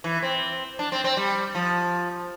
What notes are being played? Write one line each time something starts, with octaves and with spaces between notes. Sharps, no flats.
E3
C4
D4
C4
C4
G3
F3